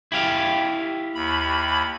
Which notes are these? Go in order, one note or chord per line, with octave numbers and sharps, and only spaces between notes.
E4 G4 F5
D#2 B5